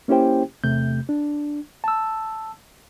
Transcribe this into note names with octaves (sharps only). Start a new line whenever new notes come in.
A#3 C#4 E4 G4 C5 G5
E2 C3 A3 G6
D4
A5 E6